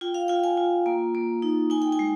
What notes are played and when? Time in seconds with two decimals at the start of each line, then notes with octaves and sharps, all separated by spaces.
0.01 F4 G5
0.14 F5
0.28 F4 G5
0.44 G#5
0.57 F4
0.86 A#3
1.15 A#3
1.42 D#4
1.70 D#4 G#5
1.82 G5
1.92 G#5
1.99 G#3